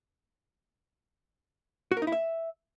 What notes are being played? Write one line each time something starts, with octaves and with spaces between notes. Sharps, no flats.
F#4
A#4
D#4
E4
E5